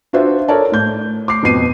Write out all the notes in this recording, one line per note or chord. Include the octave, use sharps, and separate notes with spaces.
D4 F4 F#4 C5 E5
A4 A#4 C#5 D5 A5
A2 G6
D6 C7
F2 B2 C4 C7 D#7